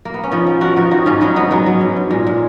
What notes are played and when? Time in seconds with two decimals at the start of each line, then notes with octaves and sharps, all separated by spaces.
0.05 A#3
0.14 B3
0.24 C#4
0.31 F3 B3 D#4
0.46 F3
0.61 F3 F#4 A#4
0.76 F3 D#4 F#4
0.91 D#3 D#4 F#4
1.06 G#2 C#4 F4
1.21 F#3 B3 D#4
1.36 G#2 B3 D#4
1.51 F#3 G#3 B3
1.66 F#3
1.81 G#2
1.96 G#2
2.11 A#2 G#3
2.27 A#2